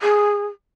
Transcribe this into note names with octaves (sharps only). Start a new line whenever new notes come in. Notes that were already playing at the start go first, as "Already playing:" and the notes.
G#4